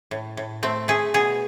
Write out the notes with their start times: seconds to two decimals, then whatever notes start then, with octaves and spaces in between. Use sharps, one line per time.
0.11 A2
0.37 A2
0.63 A3 C4
0.88 A3 G#4
1.14 B2 G#4